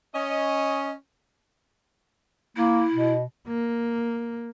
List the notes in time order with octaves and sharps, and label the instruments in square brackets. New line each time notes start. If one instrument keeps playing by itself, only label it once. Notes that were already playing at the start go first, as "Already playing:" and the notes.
[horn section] C#4 D#5
[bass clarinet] A#3 [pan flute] E4
[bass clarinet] B2
[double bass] A#3